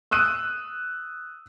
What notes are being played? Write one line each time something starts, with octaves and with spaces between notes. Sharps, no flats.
D#6 E6 F#6 D#7